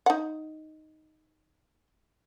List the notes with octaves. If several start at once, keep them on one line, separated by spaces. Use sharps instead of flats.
D#4 F#5